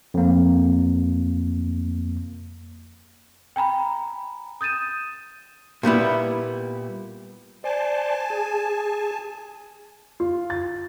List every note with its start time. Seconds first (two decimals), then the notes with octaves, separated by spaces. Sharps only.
0.14 F2 A#3
3.56 G5 G#5 A#5 B5
4.61 D#6 G6 A6 D#7 E7
5.83 A#2 G3 B3 E4
7.64 C5 D5 G#5 A5
8.30 G#4
10.20 F4
10.50 A6